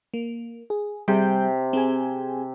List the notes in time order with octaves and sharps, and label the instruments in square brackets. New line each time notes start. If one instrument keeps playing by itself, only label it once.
[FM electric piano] A#3
G#4
[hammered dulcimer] C3 [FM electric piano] G3 G#4 G6
[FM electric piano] C4 G#4 G#5